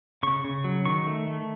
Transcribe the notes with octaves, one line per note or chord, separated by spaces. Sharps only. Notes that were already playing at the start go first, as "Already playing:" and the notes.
C#3 C#6
C#3
F#3
D#3 C#6
A3
A3